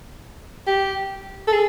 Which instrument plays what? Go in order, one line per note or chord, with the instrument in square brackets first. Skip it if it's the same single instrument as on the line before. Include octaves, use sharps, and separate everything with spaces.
[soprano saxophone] G4
A4
G#4